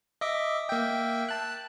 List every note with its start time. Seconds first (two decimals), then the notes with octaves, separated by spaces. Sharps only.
0.21 D#5 E5 D6
0.69 A#3 E5 G5
1.29 A5 F#6